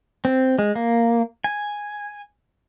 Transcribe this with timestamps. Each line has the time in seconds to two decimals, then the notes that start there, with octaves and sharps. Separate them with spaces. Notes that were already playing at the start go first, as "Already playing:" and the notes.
0.25 C4
0.59 G#3
0.75 A#3
1.44 G#5